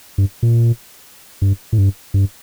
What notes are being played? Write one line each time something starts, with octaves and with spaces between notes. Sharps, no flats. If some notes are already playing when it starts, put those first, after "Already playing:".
G2
A#2
G2
A2
G2
G2